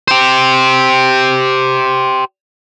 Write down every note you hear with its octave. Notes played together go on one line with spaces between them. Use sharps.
G4 C5